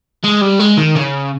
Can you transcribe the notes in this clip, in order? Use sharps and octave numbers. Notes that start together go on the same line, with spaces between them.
G#3
G3
G#3
D#3
C#3